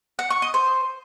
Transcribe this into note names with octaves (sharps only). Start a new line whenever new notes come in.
F#5
C#6
D#5
C5